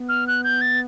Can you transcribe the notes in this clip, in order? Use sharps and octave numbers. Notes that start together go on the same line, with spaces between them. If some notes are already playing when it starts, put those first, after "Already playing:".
Already playing: B3
F6
F#6
G6
A6